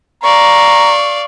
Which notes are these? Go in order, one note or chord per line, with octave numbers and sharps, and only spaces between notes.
D5 F5 A#5 C#6